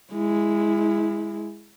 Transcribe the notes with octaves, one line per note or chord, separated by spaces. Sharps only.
G#3 E4